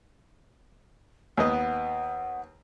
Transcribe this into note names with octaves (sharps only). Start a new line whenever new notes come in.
D#2 B3 D#5 F#5